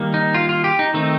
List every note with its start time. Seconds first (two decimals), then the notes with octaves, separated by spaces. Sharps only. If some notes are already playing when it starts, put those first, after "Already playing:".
Already playing: D#3 G3 A#3
0.14 D#4
0.34 F4
0.49 F4
0.64 G4
0.79 D#4
0.94 D#3 A3 C4 D#4